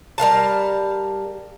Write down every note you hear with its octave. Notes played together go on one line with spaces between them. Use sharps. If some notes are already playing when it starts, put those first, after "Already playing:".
G3 A#4 F5 A5